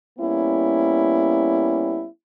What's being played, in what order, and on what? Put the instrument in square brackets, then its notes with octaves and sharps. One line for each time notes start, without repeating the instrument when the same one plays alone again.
[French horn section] G3 A#3 B3 C#4 E4